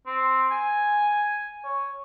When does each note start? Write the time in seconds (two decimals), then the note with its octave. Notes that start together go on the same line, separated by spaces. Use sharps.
0.06 C4
0.51 G#5
1.64 C#5